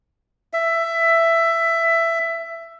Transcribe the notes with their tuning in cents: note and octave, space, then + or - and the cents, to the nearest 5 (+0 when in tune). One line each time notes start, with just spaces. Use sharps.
E5 +15